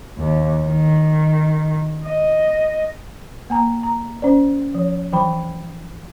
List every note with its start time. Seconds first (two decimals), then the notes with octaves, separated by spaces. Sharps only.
0.17 D#2
0.66 D#3
2.06 D#5
3.50 A#3 G#5 A#5
3.83 A#5
4.22 C#4 C5 D5
4.75 F3 C#5
5.13 E3 F#3 G5 B5